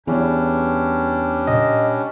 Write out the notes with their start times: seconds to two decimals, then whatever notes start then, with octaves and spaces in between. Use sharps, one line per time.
0.07 E2 G3 C#4 D4 E4
1.47 A#2 D#5